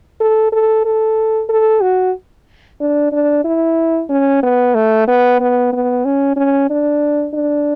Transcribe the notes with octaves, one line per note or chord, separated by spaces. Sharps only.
A4
A4
A4
A4
F#4
D4
D4
E4
C#4
B3
A3
B3
B3
B3
C#4
C#4
D4
D4